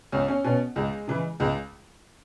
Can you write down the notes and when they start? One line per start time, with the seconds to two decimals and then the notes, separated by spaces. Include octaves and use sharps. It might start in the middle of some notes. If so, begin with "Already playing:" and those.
0.12 C#2 C#4
0.28 C#4
0.44 B2 C#4
0.76 C#2 G#3
1.07 C#3 E3
1.40 C#2 G#3